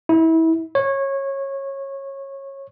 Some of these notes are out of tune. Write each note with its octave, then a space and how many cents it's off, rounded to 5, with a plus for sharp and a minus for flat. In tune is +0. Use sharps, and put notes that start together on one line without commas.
E4 -25
C#5 -20